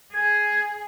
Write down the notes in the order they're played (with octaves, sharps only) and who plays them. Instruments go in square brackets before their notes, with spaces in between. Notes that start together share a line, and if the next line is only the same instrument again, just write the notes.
[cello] G#4 [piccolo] G#6